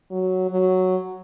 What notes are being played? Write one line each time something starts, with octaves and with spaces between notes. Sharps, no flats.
F#3
F#3